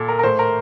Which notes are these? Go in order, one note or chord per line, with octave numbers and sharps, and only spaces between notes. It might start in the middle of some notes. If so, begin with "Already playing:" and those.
Already playing: A#2 A4
A#4
A#4
A2 A3 C5
A#4